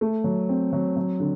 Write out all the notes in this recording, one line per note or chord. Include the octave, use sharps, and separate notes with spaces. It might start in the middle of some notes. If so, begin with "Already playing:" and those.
A3
F#3
C4
F#3
F#3
D3